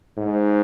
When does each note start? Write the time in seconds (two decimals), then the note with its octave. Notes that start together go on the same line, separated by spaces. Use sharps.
0.18 G#2